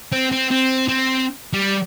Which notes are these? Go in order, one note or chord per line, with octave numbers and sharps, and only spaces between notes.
C4
C4
C4
C4
G3